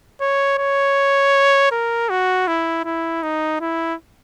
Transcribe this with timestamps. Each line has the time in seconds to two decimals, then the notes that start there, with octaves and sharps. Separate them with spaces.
0.21 C#5
0.58 C#5
1.71 A#4
2.09 F#4
2.47 E4
2.85 E4
3.23 D#4
3.61 E4